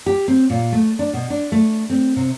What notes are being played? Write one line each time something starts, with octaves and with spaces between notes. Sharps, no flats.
G4
C4
A#2
A3
D4
B2
D4
A3
C4
C3